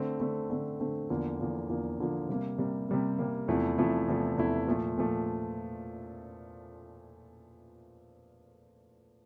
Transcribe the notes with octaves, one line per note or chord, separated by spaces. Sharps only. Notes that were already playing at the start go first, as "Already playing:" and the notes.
Already playing: D3 A3 C4
D3 A3 C4
D3 A3 C4
D3 A3 C4
E2 D3 F3 A#3
E2 D3 F3 A#3
E2 D3 F3 A#3
E2 D3 F3 A#3
C3 G3 A#3
C3 G3 A#3
C3 G3 A#3
C3 G3 A#3
E2 C3 F3 A3 E4
E2 C3 F3 A3 E4
E2 C3 F3 A3 E4
E2 C3 F3 A3 E4
A#2 F3 A3
A#2 F3 A3